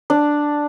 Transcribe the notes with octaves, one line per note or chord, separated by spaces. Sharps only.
D4